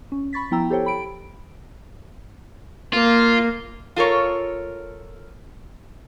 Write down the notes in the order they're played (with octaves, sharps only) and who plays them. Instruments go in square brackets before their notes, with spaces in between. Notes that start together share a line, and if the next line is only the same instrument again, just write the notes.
[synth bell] C#4
B5 C#6 A6 B6
F3 B3 E4 G5 A#5 E6
G4 A4 C5 C#5 G5
B5 D7
[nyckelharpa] A#3 [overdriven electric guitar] F4
[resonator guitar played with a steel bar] F4 A4 A#4 C#5